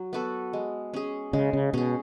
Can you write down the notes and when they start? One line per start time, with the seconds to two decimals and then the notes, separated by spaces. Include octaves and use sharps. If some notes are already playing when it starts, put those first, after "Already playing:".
Already playing: F#3
0.13 B3 F#4 A4
0.53 G#3
0.94 C#4 G#4
1.33 C#3 G#3
1.53 C#3
1.73 B2 C#4 G#4